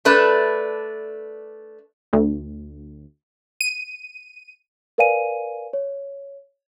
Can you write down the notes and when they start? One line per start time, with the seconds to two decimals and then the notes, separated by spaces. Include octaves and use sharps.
0.05 A3 D4 B4
2.13 D2
3.61 D#7
4.98 A#4 B4 D5 F5 G#5 D#7
5.73 C#5